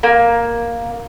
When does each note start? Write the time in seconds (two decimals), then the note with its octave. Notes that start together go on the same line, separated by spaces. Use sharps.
0.03 A#3